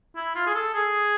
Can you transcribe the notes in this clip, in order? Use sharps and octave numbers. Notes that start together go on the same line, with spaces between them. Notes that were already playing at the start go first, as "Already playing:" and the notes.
E4
F4
G#4
A4
G#4